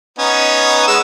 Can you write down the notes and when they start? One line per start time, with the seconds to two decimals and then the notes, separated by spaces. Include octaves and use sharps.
0.19 B3 C#4 D#4
0.88 G#3 B3 E6